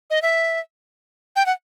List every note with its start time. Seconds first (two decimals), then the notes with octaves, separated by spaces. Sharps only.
0.10 D#5
0.22 E5
1.36 G5
1.46 F#5